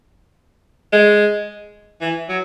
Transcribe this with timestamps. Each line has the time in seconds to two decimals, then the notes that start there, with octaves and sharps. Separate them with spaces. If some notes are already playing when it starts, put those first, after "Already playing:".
0.93 G#3
2.01 E3
2.29 F#3